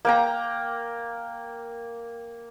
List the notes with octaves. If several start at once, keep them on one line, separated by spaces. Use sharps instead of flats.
A#3 G5 A#5